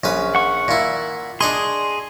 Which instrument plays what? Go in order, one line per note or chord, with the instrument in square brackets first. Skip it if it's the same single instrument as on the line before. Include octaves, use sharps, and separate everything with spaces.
[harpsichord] A#1 C#4 B4
[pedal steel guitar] F#5 C#6
[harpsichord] A#2 E4
[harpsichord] D4 D#5 C#6 [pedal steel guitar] G#4 C6